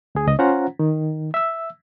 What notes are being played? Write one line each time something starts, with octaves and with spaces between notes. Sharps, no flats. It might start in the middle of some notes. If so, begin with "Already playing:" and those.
D2 G#4
C#2 D#5
C#4 F4 C5 F#5 A#5
D#3
E5 E6